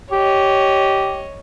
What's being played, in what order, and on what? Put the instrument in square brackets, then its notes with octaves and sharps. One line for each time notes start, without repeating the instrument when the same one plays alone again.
[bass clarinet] G4 [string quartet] C#5 D#5